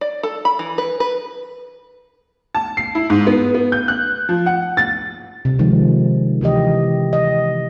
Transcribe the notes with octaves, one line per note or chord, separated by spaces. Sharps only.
D5
A4
B5
E3
B4
B4
A5
C7
E4
G#2
B3
B3
G6
F#6
F3
F#5
A6
C3
D#3 F3 G#3
C3 E3 G4 D#5
D#5